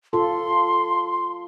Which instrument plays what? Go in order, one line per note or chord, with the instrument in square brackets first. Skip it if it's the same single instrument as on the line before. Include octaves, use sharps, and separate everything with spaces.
[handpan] F4 A4 [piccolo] C6